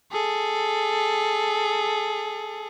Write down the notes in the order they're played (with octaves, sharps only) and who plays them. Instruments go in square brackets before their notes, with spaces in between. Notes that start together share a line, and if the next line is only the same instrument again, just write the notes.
[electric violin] G#4 A4